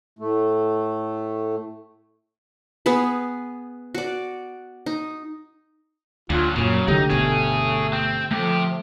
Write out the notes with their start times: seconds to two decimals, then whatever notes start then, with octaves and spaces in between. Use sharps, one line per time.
0.19 A2 A3
2.86 B3 G#4 B4
3.95 F#4 D5
4.86 D#4
6.30 D2 A#2 F#3 F4
6.56 F#2 A#2 C#3 F#3
6.88 C2 D3 A3 D#4 G4
7.10 G1 B2 A3 G#4 C#5
7.93 C4
8.31 C3 F3 A3 G4